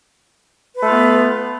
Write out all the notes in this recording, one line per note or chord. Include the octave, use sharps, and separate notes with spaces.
A3 B3 F4 B4